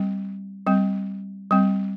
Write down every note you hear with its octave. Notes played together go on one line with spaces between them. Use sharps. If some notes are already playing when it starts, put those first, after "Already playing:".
Already playing: G3 C4
G3 C4
G3 C4